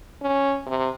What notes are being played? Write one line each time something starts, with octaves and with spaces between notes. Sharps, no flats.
C#4
C3